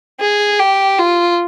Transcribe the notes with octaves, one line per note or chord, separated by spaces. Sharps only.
G#4
G4
F4